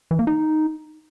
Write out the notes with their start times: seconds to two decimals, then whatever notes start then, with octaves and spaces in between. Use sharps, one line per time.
0.11 E3
0.19 A#3
0.27 D#4